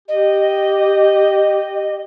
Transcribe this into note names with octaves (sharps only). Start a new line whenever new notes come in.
G4 D#5